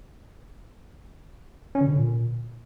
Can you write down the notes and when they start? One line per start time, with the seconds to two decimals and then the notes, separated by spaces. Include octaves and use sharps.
1.75 C#4
1.81 D3
1.86 B2
1.92 D3
1.98 A#2